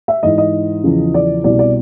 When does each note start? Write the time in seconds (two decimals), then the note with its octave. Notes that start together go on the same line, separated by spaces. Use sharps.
0.08 E5
0.23 G#2 E3 D#5
0.38 D#5
0.84 E2 C#3 F3
1.14 D5
1.44 C2 B2 D5
1.59 D5